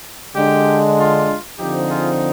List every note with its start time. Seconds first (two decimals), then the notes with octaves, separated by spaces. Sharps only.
0.34 D3 G#3 D4 G4
0.96 F4
1.58 D3 F3 C4 D#4 G4
1.89 F4 G#4